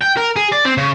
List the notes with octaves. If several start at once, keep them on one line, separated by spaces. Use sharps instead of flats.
G5
A#4
G#4
D5
C4
C#3